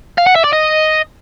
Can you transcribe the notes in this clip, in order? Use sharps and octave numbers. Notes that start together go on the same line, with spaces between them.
F5
F#5
E5
D5
D#5